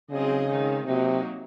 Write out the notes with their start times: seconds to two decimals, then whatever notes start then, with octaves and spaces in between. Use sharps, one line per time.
0.10 C#3 F#3 C4 D#4 G#4 D#5
0.48 D#3 G#3 C4 D#4
0.86 C3 F#3 A#3 D#4 F#4